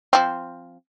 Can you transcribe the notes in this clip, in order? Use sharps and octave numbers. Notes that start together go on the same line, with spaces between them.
F3 C4